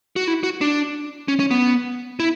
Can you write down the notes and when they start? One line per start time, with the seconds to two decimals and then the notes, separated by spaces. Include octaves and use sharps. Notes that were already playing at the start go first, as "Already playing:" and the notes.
0.16 F#4
0.28 E4
0.43 F#4
0.61 D4
1.28 C#4
1.39 C#4
1.51 B3
2.20 E4